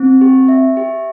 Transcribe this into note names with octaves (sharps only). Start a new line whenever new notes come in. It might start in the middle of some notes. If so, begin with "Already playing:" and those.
Already playing: C4
G4
E5
G4